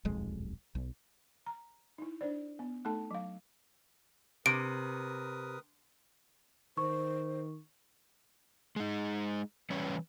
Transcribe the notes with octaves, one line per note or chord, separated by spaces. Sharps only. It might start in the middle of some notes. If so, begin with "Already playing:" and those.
D#1 B1 F2 G#3
B1
A#5
D#4 E4
D4 C5 D5
B3
A3 D#4 A4 A5
F#3 F5
C3 A#4 B4 D#6 D7
D#3 C5 C#6
G#3 D#4
E3 G3 C#4 B4 C#5